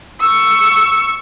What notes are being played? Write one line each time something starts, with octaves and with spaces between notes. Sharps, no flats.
C#6 E6